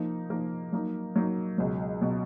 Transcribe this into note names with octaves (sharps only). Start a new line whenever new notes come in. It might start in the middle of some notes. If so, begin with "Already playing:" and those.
Already playing: F3 A#3 D#4
F3 A#3 D#4
F#3 A#3 D#4
F#3 A#3 D#4
C#2 B2 F#3
B2 F#3